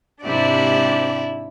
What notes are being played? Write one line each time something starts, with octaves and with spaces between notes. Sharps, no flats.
G#2 C3 D4 E4 G4 D5